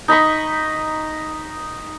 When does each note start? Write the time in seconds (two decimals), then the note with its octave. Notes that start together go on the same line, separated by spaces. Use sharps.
0.08 D#4 D#5 B5 C#6